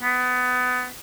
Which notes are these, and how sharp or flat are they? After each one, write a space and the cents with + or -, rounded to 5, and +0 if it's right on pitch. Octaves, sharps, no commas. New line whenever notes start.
B3 +20